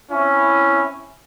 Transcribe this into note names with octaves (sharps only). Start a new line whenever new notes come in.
C4 C#4 E4